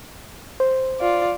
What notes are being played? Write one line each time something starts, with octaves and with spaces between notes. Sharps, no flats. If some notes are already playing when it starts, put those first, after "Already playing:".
C5
F4 D5